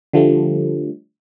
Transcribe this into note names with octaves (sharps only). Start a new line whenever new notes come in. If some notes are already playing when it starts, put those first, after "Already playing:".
D3 F3 G3 A3